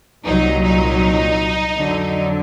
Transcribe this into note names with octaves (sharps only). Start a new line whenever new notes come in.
C2 A#2 F#3 D#4
D#4
F2 D3 F#3